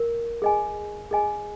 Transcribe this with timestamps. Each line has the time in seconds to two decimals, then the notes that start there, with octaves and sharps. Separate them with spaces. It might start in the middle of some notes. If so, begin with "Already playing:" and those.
Already playing: A#4
0.42 G#4 D#5 G#5
1.11 G#4 D#5 G#5